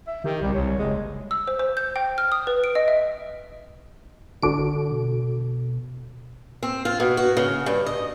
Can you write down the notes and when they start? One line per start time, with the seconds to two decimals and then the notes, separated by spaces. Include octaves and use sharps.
0.07 E5
0.24 D#3 G4
0.42 C2 G3
0.54 C2 C#5
0.78 F#1 G#3
1.31 E6
1.47 C5
1.59 C5
1.77 G6
1.96 G5
2.18 F6
2.32 D#6
2.47 B4
2.64 D7
2.75 D#5
2.88 E5
4.43 G#1 D3 D4 F#4 A4 D7
4.92 B2
6.63 C4
6.85 F4
7.00 B2
7.17 F#4
7.37 C#3
7.66 G2
7.86 D#5